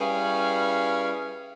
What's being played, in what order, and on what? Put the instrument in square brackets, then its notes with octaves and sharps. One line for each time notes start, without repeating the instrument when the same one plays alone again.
[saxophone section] G3 C#4 E4 G#4 B4 F5